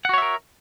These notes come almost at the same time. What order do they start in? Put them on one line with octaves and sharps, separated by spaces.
F#5 F#4 C#5 E5 A#4